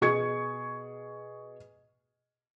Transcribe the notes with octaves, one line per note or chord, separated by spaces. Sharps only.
B2 G#4 C#6 G#6 C#7